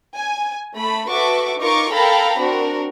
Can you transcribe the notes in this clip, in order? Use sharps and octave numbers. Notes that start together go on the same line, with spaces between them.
G#5
A3 B5
F#4 A4 B4 E5 C#6 D6
D#4 F4 A#4 C#6 D6
A4 A#4 F5 G5 A#5 B5
C4 D4 F#4 A#4